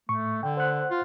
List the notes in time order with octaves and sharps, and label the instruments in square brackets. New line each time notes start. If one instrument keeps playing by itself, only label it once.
[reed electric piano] A2 C#6 [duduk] A3
[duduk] D3 [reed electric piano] G5
[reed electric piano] C5 F#5 F#6
[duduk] F4